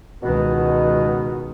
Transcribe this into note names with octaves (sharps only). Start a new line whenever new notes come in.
C#2 B2 D#3 B3